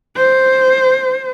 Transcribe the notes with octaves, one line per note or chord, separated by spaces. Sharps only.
C5